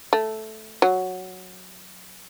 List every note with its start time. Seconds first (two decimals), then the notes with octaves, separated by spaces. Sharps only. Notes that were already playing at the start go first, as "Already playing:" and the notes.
0.13 A3
0.82 F#3